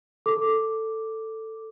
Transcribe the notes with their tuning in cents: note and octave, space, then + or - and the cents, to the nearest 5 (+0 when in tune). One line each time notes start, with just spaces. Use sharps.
A4 +10 D6 +0